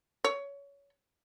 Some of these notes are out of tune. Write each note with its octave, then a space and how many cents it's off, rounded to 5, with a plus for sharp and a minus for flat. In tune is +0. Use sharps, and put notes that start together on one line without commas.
C#5 +20